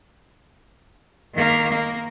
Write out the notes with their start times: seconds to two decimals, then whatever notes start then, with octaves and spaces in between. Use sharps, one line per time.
1.34 D#3 A#3
1.72 A#3